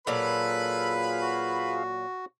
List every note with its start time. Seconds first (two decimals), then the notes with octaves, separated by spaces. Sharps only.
0.07 A#2 F#3 F4 G#4 A4 B4 F5 B5
1.21 F#4